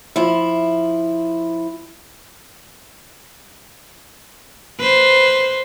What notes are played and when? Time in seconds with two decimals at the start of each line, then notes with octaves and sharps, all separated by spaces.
0.16 F3 E4
4.80 B4 C5